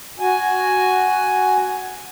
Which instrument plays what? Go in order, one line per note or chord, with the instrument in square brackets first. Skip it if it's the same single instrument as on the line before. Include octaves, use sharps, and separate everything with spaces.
[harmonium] F#4 G#5